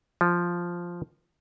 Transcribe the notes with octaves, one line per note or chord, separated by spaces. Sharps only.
F3